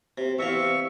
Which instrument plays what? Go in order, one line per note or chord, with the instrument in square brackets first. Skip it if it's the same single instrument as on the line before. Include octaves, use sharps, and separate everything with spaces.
[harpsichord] C3
[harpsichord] E2 C3 F5 [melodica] E5 C#6